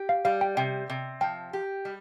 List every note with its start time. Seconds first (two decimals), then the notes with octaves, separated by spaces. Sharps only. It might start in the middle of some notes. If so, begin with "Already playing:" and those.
Already playing: G4
0.09 F5
0.25 G3 F5
0.41 G5
0.57 C3 G5
0.90 C3
1.21 F3 G5
1.53 G4
1.85 G3